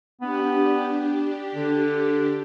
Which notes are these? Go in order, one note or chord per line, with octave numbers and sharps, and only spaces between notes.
B3 D4 G4
D3